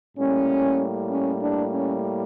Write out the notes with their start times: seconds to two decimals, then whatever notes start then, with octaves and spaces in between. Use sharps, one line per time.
0.18 A2 G3 A#3 C#4
1.11 C#4
1.42 D4
1.73 C#4